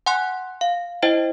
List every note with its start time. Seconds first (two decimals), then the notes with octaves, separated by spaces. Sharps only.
0.06 F#5 G#5 C6 F#6
0.61 F5
1.03 E4 C5 D#5 G5